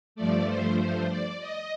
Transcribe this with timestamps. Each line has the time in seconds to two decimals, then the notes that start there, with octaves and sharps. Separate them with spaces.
0.16 G2 F3 A3 D5
0.47 C5
0.78 C5
1.09 D5
1.40 D#5